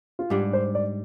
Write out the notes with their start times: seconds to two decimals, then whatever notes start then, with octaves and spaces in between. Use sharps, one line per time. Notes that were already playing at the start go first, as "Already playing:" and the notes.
0.19 F4
0.30 G#2 G3 D4 G4
0.53 C5
0.75 D5